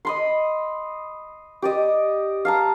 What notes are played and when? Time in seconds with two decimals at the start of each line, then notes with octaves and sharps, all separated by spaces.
0.05 D#5 B5 C6
1.62 G4 D5 D#5
2.45 F5 A5 A#5